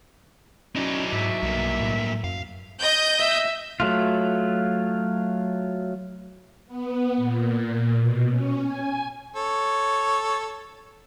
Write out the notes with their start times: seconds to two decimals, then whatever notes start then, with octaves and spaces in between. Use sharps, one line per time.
0.76 F#3 C#4 D#4 E4 D5
1.13 G#2 E5
1.42 B1 G2 A#3
1.80 A2
2.24 F#2 F5
2.80 D#5 G6
3.20 E5
3.80 F#3 A3 F4
6.66 B3
7.16 A#2
7.97 B2
8.29 C#4
8.65 G#5
9.36 A4 C#5